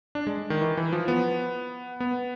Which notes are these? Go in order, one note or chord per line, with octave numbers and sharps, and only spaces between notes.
D4
G#3
D#3
E3
E3
F3
B3
B3